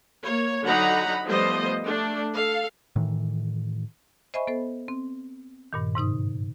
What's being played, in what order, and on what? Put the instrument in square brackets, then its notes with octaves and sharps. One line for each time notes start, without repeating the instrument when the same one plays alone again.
[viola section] A#3 C#5
D3 F#3 D#4 F#5 A#5 B5
F3 G3 A3 B3 C5 D#5
A3 D4
A4 F5
[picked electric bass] A2 D#3 E3
[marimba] C5 D#5 E5 G#5 B5 C#6
B3 A4 C5
C4
G2 A#2 D#3
G#2 C3 D#4 D#6